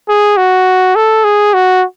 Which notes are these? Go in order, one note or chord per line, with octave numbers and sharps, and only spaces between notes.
G#4
F#4
A4
G#4
F#4